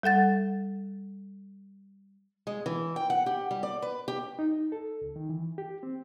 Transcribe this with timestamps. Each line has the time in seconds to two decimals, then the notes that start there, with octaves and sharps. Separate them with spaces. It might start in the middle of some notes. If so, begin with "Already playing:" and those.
0.03 G3 A4 F#5 A6
2.47 G#3
2.66 E3
2.96 G5
3.10 F#5
3.26 G4
3.51 G3
3.63 D5
3.82 B4
4.08 G4
4.39 D#4
4.72 A4
5.01 C#2
5.16 D#3
5.29 E3
5.58 G4
5.83 C4